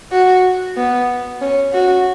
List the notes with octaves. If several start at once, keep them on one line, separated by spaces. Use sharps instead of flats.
F#4
B3
C#4
F#4